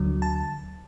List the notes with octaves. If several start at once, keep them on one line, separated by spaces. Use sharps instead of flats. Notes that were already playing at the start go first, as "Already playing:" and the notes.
Already playing: D2 D3 F#3
A5